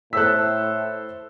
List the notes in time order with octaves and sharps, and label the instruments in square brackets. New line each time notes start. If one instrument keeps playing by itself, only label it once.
[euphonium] A2 [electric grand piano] A4 C5 B6 [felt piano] E6 F#6